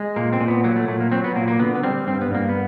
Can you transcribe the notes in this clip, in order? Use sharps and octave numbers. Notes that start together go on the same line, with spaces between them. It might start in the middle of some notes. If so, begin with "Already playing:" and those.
Already playing: G#3
A#2 A#3
C4
A#2
B3
F#3 A#3
A3
A#2 A3
A#3
F#3 C4
B3
A#2 A#3
A#3
D3 B3
B3
G3 C4
G2 C4
B3
G2 A#3
B3